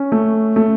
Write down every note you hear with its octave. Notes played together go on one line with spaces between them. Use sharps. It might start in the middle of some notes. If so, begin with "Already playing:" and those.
Already playing: C#4
A3
A3